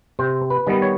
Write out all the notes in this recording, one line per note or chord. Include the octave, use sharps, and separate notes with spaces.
C3 C5
B4
D#3 G3 B3
C#5